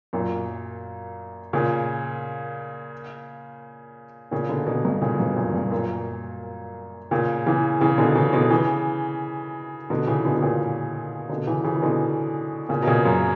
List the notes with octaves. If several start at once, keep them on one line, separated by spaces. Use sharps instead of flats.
F#2 A#2
A#2 C#3
A#2 C#3
B2 D3
B2 D3
G2 B2
A#2 C#3
G2 B2
F#2 A#2
G2
F#2 A#2
A#2 C#3
C#3 E3
C#3 E3
B2 D3
C#3 E3
B2 D3
C#3 E3
B2 D3
C#3 E3
B2 D3
D3
A#2 C#3
B2 D3
C#3 E3
C#3 E3
E3
B2 D3
A#2 C#3
B2
A#2 C#3
F#2